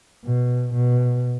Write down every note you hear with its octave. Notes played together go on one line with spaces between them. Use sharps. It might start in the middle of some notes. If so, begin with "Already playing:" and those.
B2
B2